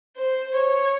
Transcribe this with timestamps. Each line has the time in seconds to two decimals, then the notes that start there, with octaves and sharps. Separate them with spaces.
0.17 C5
0.56 C#5